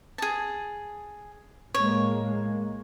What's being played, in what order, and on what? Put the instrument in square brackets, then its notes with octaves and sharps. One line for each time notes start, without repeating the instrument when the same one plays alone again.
[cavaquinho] G#4 A5
[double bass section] A2 G#3 A#3 [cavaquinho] C#5